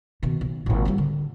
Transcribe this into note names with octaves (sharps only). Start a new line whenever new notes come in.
B2 D#3
B1
G#1 A#2
F3 G3
D3